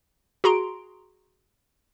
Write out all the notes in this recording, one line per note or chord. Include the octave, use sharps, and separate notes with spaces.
F#4 G#4 A#5 C6 D7